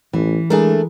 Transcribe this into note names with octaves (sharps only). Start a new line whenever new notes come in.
A1 E3
G#3 A3 D4 G#4 A#4